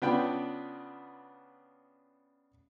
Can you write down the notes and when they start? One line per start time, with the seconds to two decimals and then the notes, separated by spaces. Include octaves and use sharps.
0.02 C#3 B3 D4 F4 G5 B5